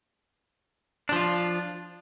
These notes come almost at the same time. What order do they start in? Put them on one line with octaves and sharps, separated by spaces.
D4 F3 F4